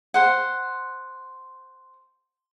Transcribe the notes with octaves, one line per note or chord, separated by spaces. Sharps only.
C5 F#5